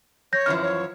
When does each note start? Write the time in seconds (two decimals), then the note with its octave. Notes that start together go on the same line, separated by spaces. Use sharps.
0.33 C#5 G6 A#6
0.46 F#2 E3 F3 F6
0.62 C#5